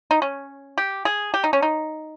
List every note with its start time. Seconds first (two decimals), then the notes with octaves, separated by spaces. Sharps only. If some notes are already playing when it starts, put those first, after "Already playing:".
0.11 D#4
0.22 C#4
0.78 G4
1.05 G#4
1.34 G4
1.44 D#4
1.53 C#4
1.62 D#4